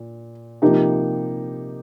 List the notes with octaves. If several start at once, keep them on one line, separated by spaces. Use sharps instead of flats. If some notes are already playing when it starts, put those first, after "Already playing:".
Already playing: A#2
C3 F3 A#3 D#4 G4